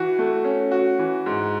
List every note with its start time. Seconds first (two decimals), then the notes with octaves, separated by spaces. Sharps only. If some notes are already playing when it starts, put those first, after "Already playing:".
Already playing: E3 F#4
0.19 A3
0.45 C#4
0.72 F#4
0.99 E3
1.26 G#2